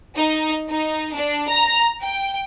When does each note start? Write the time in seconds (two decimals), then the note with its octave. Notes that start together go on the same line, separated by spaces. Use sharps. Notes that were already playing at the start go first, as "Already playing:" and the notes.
0.16 D#4
0.69 D#4
1.14 D4
1.48 A#5
2.02 G5